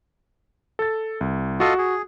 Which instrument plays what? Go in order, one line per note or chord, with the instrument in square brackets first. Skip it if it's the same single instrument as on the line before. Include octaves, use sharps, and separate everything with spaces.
[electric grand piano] A4 A6
C2
[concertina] F4 A4 D#5 [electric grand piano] F#4
[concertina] G#4